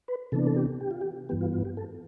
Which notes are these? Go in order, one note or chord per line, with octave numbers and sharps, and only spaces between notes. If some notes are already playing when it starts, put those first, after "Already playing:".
B4
C3 E3 B3 D4 A4
A4
G4
G4
F4
G4
G2 E3 B3 G4
F4
F4
G4
A4